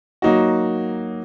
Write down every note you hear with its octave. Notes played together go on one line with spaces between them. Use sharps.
F#3 A#3 D#4 F#4